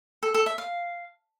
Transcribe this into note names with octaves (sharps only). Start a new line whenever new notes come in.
A4
A4
E5
F5